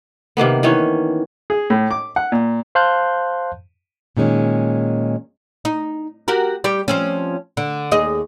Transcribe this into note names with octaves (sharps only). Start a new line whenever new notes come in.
C3 D#3 A#3 B3
D#3 E3 C#4 C#5
G#4
A2
D6
F#5
A#2
C5 F5 A5 C6 F#6 G6
A#2 D#3 G#3 C#4
D#4
F#4 G4 A#4
G3 G4
F3 C4 C#4
D3
D#2 G#4 D#5